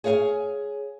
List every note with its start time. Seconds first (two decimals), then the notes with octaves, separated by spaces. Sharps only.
0.04 G#4 C#5 F5 F#5 G#5